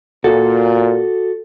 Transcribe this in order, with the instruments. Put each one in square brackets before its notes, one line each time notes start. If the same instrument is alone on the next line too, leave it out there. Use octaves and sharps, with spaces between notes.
[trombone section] A#2 [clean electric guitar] F#4 [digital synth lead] A4